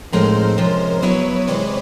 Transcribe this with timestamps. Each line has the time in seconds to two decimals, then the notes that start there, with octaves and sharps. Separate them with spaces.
0.12 A2 F3 G#3 C4 D#4 A#4 C5
0.58 C3 F3 G#3 C#4
1.02 F#3 B3 E4 B4 C#5
1.47 C3 E3 G#3 C5 D5